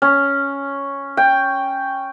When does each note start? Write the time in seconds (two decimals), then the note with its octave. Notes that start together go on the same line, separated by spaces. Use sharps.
0.02 C#4
1.17 G5